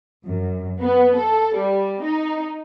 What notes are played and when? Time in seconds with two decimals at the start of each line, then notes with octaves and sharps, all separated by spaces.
0.25 F#2
0.80 B3
1.16 A4
1.55 G3
2.01 D#4